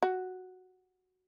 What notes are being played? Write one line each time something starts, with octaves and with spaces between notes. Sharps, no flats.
F#4